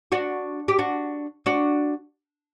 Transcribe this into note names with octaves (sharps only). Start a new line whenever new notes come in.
D4 F#4
G4
D4 F#4
D4 F#4